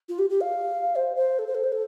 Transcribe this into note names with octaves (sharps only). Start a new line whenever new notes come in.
F4
G4
G4
F5
C5
C5
A4
C5
A4
C5
A4